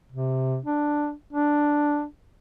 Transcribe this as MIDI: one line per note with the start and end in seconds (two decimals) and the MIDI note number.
0.12 0.59 48
0.65 1.13 62
1.33 2.05 62